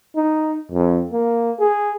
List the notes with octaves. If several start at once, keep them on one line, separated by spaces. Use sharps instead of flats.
D#4
F2
A#3
G#4